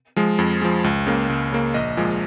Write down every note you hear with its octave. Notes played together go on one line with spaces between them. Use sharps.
F3 G#3
F2
F3 G#3
C#2
C#3 A#3
C#2
C#3 A#3
A#1 D#5
A#2 F3 G#3